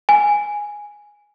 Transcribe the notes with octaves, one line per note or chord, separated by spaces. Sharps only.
G#5